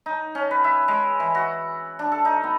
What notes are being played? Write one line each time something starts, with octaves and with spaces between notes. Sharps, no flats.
D#4
C#4
B4
E5
G#3
E3
F#4
D4
A4
D#4
B3